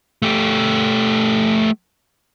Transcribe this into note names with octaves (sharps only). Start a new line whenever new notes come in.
A3 G4